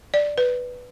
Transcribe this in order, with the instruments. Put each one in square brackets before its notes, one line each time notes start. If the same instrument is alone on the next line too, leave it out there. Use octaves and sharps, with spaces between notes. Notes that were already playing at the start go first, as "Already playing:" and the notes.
[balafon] D5
B4